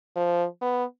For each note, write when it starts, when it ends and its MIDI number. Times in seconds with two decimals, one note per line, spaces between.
0.16 0.46 53
0.61 0.84 59